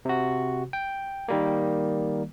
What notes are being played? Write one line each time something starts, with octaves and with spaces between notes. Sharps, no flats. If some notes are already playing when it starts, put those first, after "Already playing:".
C3 F#4
G5
D#3 G3 A#3